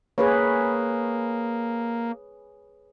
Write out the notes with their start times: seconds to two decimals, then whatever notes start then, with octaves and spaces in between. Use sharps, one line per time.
0.18 A#3 G#4 B4 C#5